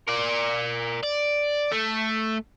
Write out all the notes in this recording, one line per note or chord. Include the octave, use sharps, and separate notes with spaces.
A#4 D5
D5
A3